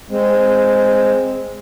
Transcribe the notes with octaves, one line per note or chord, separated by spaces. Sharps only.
G#3 C4